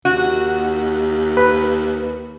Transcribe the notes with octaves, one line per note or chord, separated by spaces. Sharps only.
D#2 F#4
B4